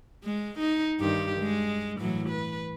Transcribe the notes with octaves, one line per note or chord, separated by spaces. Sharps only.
G#3
D#4
G2 D#3 G4
G#3
A2 E3 F#3
B4